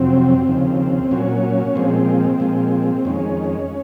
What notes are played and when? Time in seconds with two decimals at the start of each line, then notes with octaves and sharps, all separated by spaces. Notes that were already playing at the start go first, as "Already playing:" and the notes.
Already playing: F2 C3 F#3 C4
0.47 D#2 C#3 F3
1.11 A#2 F#3 C#4
1.75 A#2 F3 G#3 C4
2.40 A#2 F3 G#3
3.05 F2 D#3 G#3 C#4